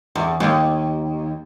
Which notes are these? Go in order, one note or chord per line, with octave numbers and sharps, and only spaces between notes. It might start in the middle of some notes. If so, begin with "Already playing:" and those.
E2
D#2